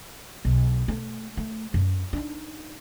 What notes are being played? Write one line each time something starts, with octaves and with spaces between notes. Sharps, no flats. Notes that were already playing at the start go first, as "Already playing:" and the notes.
B1
A3
A3
F#2
D4 D#4